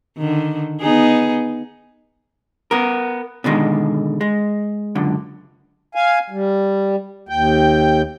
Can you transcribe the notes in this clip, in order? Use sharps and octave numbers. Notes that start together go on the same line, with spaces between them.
D3 D#3
B3 D#4 G#4
B3 A#4
B2 D3 D#3 G#3
G#3
C#2 F#2 D3
F5 G#5
G3
D#2 G5